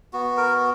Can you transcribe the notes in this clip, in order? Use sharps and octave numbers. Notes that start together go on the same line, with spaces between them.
B3 F#4
A#4